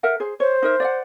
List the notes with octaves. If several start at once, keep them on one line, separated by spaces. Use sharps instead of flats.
A#4 E5 F#5
G#4 C5
C5 C#5
D#4 A#4 E5
D5 E5 F#5